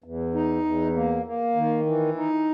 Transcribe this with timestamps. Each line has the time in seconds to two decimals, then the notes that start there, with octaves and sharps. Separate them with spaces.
0.04 E2
0.34 D#4
0.65 E2
0.96 A#3
1.26 A#3
1.56 D#3
1.86 E3
2.17 D#4